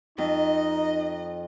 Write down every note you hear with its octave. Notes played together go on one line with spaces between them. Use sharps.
F2 D#4 D#5